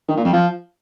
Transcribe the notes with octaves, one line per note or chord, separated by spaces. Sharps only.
D#3
A#2
F2
F3